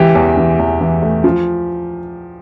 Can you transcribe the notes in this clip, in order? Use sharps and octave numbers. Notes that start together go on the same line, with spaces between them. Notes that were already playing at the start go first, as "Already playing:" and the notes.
Already playing: C#2 E3 G4
E2
E3
E2
E3
A3
F3